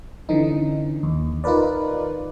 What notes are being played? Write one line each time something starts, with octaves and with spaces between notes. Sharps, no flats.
D3 E3 C#4 D#4
D#2
D#4 F4 A#4 B4 D5